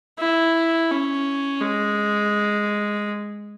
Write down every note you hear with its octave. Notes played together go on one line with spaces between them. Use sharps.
E4
C#4
G#3